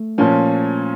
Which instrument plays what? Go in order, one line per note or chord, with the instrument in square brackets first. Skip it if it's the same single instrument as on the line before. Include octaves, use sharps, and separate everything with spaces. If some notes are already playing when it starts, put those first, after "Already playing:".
Already playing: [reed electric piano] A3
[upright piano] A#2 F3 C#4